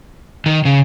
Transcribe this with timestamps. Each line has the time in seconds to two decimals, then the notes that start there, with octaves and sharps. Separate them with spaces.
0.46 D#3
0.65 C#3